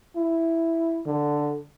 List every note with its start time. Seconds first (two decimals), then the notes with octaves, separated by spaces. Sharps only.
0.16 E4
1.06 D3